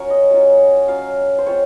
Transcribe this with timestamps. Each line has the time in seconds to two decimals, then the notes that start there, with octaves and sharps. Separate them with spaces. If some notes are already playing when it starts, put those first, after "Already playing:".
Already playing: F#3 C#4 F4 A#4 C#5
0.10 D#5
0.31 F#3 C#4 F4
0.88 F#3 C#4 F4 F5
1.38 C5
1.46 G#3 C4 F4 C#5